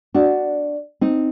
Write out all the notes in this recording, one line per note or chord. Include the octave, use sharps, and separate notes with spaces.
D4 F#4
C4 D#4